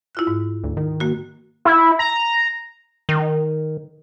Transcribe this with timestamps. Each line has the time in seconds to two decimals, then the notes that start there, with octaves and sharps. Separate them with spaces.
0.15 E4 F4 F#6
0.27 G#2
0.64 D2
0.77 D#3
1.00 A#3 F#4
1.65 E4
1.99 A#5
3.09 D#3